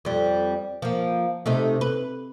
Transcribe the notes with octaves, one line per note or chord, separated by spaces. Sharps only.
F2 G3
F3 A#3
C3 A3 D#4
B4